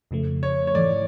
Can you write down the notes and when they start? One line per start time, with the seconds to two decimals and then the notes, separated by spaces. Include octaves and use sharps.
0.11 F2 C#3 F3 A3
0.43 C#5
0.67 C#5
0.75 G#2 E3 A3 D5